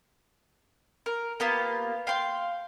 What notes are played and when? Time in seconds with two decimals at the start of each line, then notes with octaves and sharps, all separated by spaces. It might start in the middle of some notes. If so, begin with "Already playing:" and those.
1.06 A#4
1.40 A#3 B3 F4 G4
2.07 F5 G5 C6